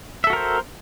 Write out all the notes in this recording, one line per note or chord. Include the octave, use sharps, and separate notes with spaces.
F#4 A4 A#4 C5 E5